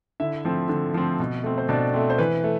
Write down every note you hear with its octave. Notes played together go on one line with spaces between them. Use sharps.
D3 E4 E5
F3 A3 C4
D3
F3 A3 C4
B2
A3 C4
C5
B2 D4 D5
A3 C4
C5
E3 B4
A3